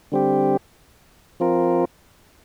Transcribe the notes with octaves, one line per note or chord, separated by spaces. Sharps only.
D3 G3 C4 G4
F3 C4 F4 A#4